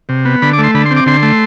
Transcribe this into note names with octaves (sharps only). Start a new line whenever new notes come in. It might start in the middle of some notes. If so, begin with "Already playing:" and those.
C3
B3
D3 B5
D6
A3
C6
D3 B5
C6
C4
D6
D3 C6
A3